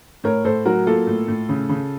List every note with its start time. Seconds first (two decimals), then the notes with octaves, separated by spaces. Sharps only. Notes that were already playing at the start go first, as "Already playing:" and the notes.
0.24 A2 A#4 C#5
0.44 A2 A4 C5
0.65 F#3 F#4 A#4
0.86 A#3 F4 A4
1.07 A2
1.28 A2
1.49 C#3
1.69 C#3